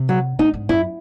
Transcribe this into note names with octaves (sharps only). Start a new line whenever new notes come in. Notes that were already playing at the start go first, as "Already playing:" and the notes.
Already playing: C3
F#3
A2 D#4
G#2
F#2 E4